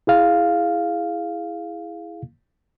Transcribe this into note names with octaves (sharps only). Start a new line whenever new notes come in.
E4 G#4 F5